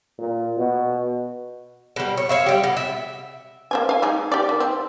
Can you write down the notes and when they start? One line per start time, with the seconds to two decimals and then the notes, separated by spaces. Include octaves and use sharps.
0.19 A#2
0.58 B2
1.96 B2 G3
2.17 C#5
2.29 C#5 E5 F5
2.46 G3 G4
2.64 B2
2.77 E5
3.71 A#3 C4 G#5
3.89 F5 G#5
4.02 G#3 D#4 G#4
4.32 G4 D5
4.49 D#3
4.60 C4